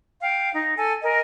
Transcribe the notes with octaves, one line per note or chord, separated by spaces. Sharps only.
F5 G5
D#4
A4 G#5
A#4 D#5 G#5